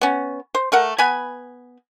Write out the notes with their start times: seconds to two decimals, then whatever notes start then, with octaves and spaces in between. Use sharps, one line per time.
0.01 B3 C#4
0.55 C5
0.72 A3 A#4 F#5
0.98 B3 G#5 B5